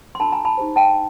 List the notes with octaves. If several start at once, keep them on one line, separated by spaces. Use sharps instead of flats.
C6
D4 F#4 A#4 A5 B5
G#5 A#5
A5 B5
D#4 G4 C5
G5 A5